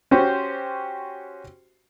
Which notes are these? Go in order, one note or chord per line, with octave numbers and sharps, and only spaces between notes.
C#4 F#4 G4 C5